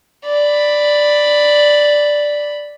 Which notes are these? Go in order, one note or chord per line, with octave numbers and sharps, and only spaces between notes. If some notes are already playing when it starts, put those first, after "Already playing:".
D5 B5